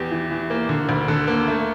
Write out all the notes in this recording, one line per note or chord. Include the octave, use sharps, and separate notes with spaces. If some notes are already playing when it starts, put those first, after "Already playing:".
Already playing: E2 G4
E3
E3
A#3
D3
D2
D3 A4
A#3
A3